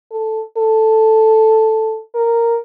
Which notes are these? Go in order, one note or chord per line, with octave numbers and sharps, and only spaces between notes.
A4
A4
A#4